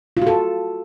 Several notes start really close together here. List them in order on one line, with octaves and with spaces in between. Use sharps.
F4 F#4 A4